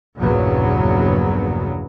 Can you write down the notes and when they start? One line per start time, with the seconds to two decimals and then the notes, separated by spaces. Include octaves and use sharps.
0.18 A#1 E2 G2 C#3 F#3 B3